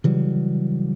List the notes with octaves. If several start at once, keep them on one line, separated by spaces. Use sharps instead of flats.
C#3 E3 F#3 G3